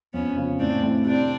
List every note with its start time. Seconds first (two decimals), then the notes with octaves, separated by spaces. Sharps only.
0.14 F2 B3 C#4
0.37 C#3 F3
0.59 A2 C4 D4
0.82 E3 A3 C4 E4
1.05 C3 C4 D4